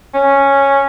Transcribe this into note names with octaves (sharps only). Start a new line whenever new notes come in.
C#4